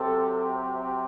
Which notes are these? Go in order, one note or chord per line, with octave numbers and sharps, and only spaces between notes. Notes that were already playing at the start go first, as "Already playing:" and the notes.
Already playing: C3 F#3 C4 A4